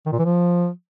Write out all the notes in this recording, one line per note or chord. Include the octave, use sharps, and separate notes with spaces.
D#3
A#2
E3
F3